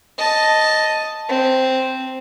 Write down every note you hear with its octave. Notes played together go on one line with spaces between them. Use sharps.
D#5 A5
C4